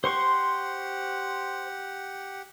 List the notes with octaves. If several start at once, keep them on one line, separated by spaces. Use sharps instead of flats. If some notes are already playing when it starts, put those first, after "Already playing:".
G4 C5 F#5 C6 C#6